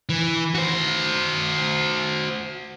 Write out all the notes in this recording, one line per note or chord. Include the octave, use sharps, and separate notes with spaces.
E3
F#4 C5